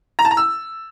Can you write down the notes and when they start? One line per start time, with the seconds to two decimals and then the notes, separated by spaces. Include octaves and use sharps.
0.19 A#5
0.25 A5
0.31 A#5
0.37 E6